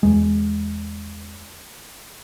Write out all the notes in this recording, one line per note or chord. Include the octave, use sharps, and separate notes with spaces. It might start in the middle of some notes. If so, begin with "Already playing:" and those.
E2 G#3